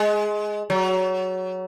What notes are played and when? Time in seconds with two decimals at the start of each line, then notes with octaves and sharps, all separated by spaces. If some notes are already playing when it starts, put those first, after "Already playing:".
Already playing: G#3
0.70 F#3